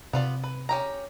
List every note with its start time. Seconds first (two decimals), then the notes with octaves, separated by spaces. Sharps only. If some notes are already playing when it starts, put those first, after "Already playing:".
0.13 C3 B3 F4 D5
0.44 B4
0.69 C#4 G4 A#5